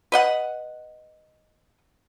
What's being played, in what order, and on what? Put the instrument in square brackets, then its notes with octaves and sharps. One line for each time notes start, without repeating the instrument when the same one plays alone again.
[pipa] B4 D#5 F#5